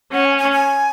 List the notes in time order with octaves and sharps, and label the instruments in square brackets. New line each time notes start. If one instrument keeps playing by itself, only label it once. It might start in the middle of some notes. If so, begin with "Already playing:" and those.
[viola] C#4 [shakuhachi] F#5
[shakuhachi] G#5
G#5
G#5